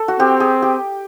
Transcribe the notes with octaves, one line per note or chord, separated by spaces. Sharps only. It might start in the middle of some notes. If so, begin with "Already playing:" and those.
Already playing: A4
F#4
C4 G4
G#4
G4